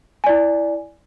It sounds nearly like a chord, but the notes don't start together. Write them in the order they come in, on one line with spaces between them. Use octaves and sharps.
G#5 D5 E4